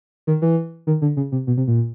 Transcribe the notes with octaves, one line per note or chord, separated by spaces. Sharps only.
D#3
E3
D#3
D3
C#3
C3
B2
C3
A#2